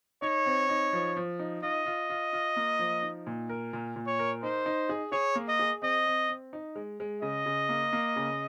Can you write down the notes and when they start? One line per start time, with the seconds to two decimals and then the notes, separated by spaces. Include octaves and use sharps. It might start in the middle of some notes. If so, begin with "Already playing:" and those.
0.22 D#4 C#5
0.46 C4
0.69 D#4
0.93 F3
1.16 F3
1.40 D#4
1.62 F4 D#5
1.86 F4
2.10 F4
2.33 F4
2.56 A#3
2.79 F3
3.02 D#4
3.27 A#2
3.49 A#4
3.73 A#2
3.96 A#2
4.07 C#5
4.19 A#4
4.43 D#4 C5
4.66 D#4
4.89 G#4
5.12 G#4 C#5
5.35 A#3
5.48 D#5
5.59 G#4
5.82 C4 D#5
6.07 C4
6.29 C4
6.53 D#4
6.75 G#3
7.00 G#3
7.22 C#3 D#5
7.46 C#3
7.69 A#3
7.93 A#3
8.16 C#3